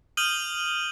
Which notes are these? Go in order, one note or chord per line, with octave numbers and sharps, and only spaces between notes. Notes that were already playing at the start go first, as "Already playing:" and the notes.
D#6 F6 G6 D#7 F#7 G7